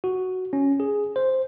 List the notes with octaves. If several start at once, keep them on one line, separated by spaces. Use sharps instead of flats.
F#4
C#4
G#4
C5